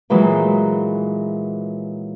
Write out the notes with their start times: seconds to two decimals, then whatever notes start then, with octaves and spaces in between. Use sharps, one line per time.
0.10 A#2 E3 F#3 G#3 A#3